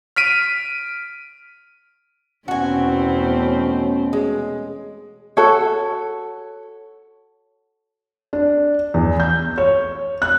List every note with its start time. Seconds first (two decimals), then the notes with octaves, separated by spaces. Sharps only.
0.16 F6 B6 D7 D#7
2.48 E2 B2 A3 C4 C#4 F#4 G#5
4.13 G#3
5.37 F#4 A4 C#5
8.33 D4
8.94 E2
9.20 G6
9.58 C#5
10.22 F#6